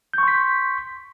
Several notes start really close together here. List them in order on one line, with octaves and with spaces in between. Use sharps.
G6 C#6 C6 B6